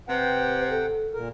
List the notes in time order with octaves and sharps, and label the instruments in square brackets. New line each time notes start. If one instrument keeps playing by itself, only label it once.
[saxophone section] C3 [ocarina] B4 [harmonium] F#5 G5
[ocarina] A4
[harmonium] A#2 A#4